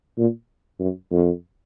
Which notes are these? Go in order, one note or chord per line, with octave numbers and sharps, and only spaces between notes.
A#2
F#2
F2